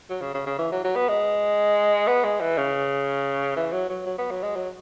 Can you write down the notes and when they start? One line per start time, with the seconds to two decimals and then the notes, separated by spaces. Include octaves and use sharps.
0.09 F#3
0.21 C#3
0.34 C#3
0.46 C#3
0.58 E3
0.72 F#3
0.84 F#3
0.96 B3
1.09 G#3
2.08 B3
2.24 G#3
2.40 E3
2.58 C#3
3.56 E3
3.72 F#3
3.89 F#3
4.06 F#3
4.18 B3
4.31 F#3
4.43 G#3
4.55 F#3